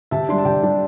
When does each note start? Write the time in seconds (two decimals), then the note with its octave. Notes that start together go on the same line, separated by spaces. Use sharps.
0.11 C3 E5 A5
0.29 G3 D4 C6
0.38 A5
0.45 C3 D5 G5
0.62 G3 D4